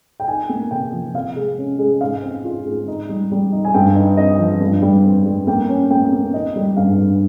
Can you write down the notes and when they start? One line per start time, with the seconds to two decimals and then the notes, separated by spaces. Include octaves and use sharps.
0.20 G5
0.28 D#4 G#5
0.49 A#3
0.71 C3 G5
0.93 F3
1.14 C3 F5
1.36 G#3
1.58 C#4
1.79 G#3
2.01 G#2 F5
2.22 C4
2.44 F4
2.66 G#2
2.88 D#4
3.09 G3
3.32 G3
3.52 D#4
3.65 G#5
3.74 G2 G5
3.95 D#4
4.17 C4 D#5
4.39 F3
4.61 G2
4.82 G3
5.04 C4
5.26 G3
5.47 A#3 G5
5.69 C#4
5.90 A#3 G5
6.12 A#3
6.34 D#4 D#5
6.56 G3
6.77 G2 F5
6.99 G2